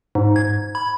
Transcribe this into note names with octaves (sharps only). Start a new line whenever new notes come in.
G#2
G#6
B5